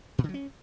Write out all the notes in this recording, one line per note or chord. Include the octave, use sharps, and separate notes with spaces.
A#2
D3
F#3
C#4